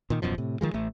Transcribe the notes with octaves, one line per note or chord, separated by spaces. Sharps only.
A#2 D#3
D#1 F#2 B2 F3
A2 C3
D#3 F3 G#3
A1 A3